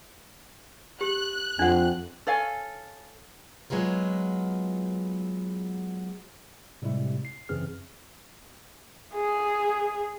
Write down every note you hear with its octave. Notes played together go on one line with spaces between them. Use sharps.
G4 F#6
F2 F3 D4 F#5
A4 C#5 F5 G#5
F#3 G#3 B3 F4 A#4
A2 C3 G3 G#3 E4
C7
F#2 C#3 E3 C4 G#4 F6
G#4